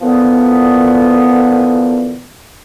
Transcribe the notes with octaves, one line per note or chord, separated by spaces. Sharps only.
A#2 D3 E3 F3 B3